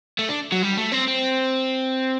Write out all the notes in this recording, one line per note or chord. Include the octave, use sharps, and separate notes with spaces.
A3
D4
F#3
G3
A3
C4
C4